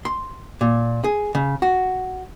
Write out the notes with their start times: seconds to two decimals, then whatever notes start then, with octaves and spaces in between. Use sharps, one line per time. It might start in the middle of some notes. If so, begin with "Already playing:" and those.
0.05 C6
0.61 A#2
1.04 G#4
1.35 C#3
1.62 F#4